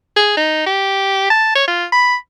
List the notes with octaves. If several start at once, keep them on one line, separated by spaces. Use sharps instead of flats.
G#4
D#4
G4
A5
C#5
F4
B5